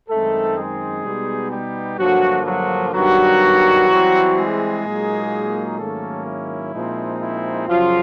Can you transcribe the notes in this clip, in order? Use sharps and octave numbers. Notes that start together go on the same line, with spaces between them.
F#2 D#3 G#3 A3 C4 D#4 A4
G#3 G#4
B2 G3 B3 D#4
G3 G4
G2 D3 F3 F#3 A#3 F#4
F#3 F#4
G2 D#3 F#3 G3 B3 F#4
E3 G3 C4
G#3 G#4
A#2 F#3 A#3 D#4
G#2 D#3 F#3 A3 A#3 C#4 A4
E4
A#2 F3 G#3 C4 D#4
E4
F#2 C#3 F3 F#3 F4